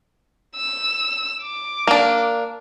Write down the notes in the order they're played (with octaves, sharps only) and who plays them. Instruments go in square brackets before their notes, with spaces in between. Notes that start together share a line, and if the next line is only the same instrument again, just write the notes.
[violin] E6
D6
[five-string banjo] A#3 D4